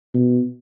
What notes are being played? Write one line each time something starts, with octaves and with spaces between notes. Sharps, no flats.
B2